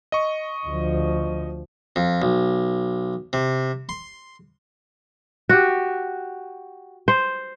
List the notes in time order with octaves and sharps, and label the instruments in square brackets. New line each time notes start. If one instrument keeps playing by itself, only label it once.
[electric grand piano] D#5 C#6
[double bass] D2 F3
[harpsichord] F2
B1
C3
C6
[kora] F#4 G4
C5